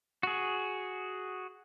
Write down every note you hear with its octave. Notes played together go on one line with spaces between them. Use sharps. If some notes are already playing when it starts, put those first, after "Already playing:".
F#4 G#4